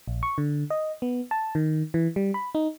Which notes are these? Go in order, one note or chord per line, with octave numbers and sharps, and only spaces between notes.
A#1
C#6
D3
D#5
B3
A5
D#3
E3
G3
B5
D#4